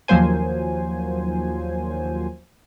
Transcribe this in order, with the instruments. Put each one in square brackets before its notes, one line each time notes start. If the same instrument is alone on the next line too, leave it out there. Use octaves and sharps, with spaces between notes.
[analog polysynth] D#2 F3 F#3 A#3 C5 G#5